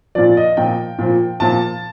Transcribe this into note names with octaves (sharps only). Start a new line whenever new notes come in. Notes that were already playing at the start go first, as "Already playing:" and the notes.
A#2 F3 D5
D#5
A#2 F3 G5
A#2 F3
A#2 F3 A5